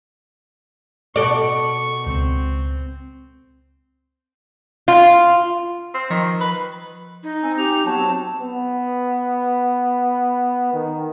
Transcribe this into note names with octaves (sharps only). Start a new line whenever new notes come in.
B2 A4 D5 C#6
C#2 C4
F4
C4 F6
D#3 F3 D#5
B4
D#4
C4 G#5
G4 F7
F#3 B3 A5
C4
B3
D#3